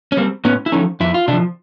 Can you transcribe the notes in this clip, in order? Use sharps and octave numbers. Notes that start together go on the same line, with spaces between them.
C#4
G3 A#3 C4
A2 B3 C#4
E4
F3 A3 C#4 D#4
F2 E4
F4
C3 D4 E4
F3